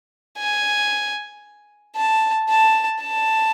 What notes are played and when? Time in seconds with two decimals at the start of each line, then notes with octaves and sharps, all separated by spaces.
0.38 G#5
1.96 A5
2.49 A5
3.02 A5